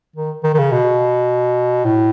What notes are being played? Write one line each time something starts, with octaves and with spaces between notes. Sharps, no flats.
D#3
D#3
D#3
C#3
B2
A2